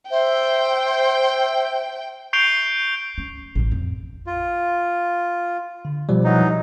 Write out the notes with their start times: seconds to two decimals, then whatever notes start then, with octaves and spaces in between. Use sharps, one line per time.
0.10 C5 E5 G5
2.33 C#6 G6 C7 D7 F7 G7
3.18 C#4
3.55 A1 E3
3.72 F2
4.27 F4
5.85 D3
6.09 B2 F3 G3
6.24 E3 F#3 D#4